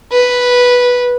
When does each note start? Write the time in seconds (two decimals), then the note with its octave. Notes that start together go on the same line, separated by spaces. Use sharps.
0.12 B4